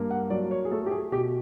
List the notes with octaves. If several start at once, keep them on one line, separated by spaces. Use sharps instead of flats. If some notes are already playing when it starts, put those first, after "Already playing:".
Already playing: G2 A#3
F#5
F#3 D5
C#5
G#4
A3 A4
G4
G#4
B2 G4